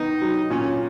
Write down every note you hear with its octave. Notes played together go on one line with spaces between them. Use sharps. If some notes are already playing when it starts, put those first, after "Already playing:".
Already playing: D#3 B3 D#4
F#3
A#2 C#4